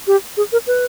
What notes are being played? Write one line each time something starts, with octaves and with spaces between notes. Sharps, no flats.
G4
G#4
A#4
B4